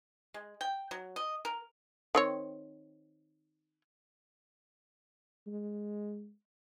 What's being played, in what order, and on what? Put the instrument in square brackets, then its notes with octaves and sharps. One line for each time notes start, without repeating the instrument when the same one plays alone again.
[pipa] G#3
G5
F#3
D#5
A#4
[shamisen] D#3 C4 C#5
[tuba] G#3